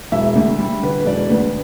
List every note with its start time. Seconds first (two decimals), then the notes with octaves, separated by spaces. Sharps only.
0.12 E1 E5
0.35 D2
0.58 G3
0.83 D3 B4
1.00 B4
1.06 E1 D5
1.30 D2 B4